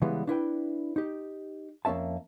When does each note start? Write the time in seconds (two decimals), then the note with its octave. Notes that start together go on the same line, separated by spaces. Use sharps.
0.02 C#3 E3 G3 G#3 B3
0.27 D4 E4 B4 G5
0.96 D#4 G4
1.85 F2 A#3 C#4 E5 A5